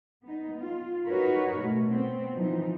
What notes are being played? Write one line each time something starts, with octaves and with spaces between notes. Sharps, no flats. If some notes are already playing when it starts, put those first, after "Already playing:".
B3 D#4
F4
D#4 F#4 A#4 B4 C#5
B2 A3
B3 C4
E3 F3 D#4